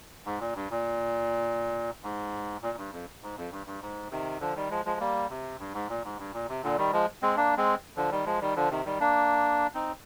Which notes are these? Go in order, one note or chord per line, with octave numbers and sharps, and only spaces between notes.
G#2
A#2
G2
A#2
G#2
A#2
G2
F2
G#2
F2
G2
G2
G#2
C3 D#3
D3 F3
D#3 G3
F3 G#3
F3 G#3
G3 A#3
C3
G2
G#2
A#2
G#2
G2
A#2
C3
A#2 D3
D#3 G3
F3 G#3
G#3 C4
A#3 D4
G#3 C4
D3 F3
D#3 G3
F3 G#3
D#3 G3
D3 F3
C3 D#3
D#3 G3
A#3 D4
C4 D#4